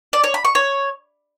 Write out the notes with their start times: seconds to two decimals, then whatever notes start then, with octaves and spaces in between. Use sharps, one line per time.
0.13 D5
0.24 C#5
0.34 B5
0.45 C#6
0.55 C#5